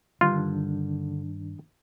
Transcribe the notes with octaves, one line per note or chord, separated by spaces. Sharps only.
G2 D3 D#3 D4 F4